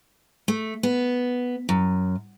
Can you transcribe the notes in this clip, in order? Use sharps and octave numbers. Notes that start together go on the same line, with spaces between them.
A3
B3
F#2